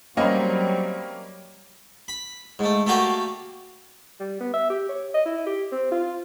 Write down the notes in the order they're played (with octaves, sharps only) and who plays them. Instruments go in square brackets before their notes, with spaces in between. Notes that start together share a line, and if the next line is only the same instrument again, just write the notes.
[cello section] F#3 G3 [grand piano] A#3 D#5 [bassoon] C4 [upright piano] C#4 B5
[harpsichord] B5
G#2 A3
A3 A#3 F#4 G4 D5
[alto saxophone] G3
B3
E5
G4
C#5
D#5
E4
G4
C4
F4